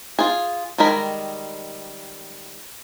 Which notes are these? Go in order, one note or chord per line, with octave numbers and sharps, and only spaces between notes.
F4 G#4
D#3 G3 G#3 A#4 B5